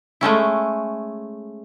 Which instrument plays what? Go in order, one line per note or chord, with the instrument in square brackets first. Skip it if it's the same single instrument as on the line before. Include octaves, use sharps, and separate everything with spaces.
[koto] G#3 A3 C#4 E4